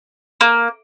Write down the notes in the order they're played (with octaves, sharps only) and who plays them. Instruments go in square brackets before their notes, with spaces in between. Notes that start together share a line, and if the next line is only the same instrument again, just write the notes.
[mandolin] A#3